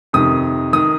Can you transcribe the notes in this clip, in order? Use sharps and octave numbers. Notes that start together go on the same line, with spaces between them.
F2 C3 D#3 D#6
D#3 D#6